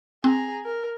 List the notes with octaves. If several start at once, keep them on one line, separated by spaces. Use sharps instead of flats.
C4 G#4 A#5
A#4